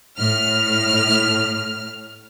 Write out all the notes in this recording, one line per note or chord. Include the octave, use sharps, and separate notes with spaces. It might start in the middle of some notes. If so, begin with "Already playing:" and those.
A2 F6